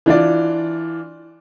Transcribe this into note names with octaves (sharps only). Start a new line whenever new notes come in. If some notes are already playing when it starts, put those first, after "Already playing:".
E3 D4 F4 D5